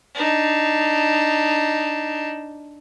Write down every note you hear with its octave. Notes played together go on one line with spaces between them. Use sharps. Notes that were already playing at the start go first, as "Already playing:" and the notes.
D4 D#4